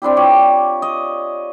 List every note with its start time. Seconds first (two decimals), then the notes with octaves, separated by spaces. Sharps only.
0.02 C4 D4 E4 G4
0.17 F4 C#5 D6
0.82 D#5